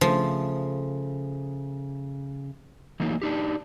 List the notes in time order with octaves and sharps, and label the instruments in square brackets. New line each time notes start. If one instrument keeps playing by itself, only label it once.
[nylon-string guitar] C#3 A3 [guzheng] F3
[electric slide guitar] E3 F#3 A3 A#3 D#4
D4 D#4 G4